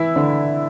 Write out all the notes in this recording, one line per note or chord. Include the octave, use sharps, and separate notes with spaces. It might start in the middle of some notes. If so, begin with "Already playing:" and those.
Already playing: E3 E4
D3 D4